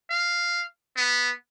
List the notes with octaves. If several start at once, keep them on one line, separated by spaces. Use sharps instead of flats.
F5
B3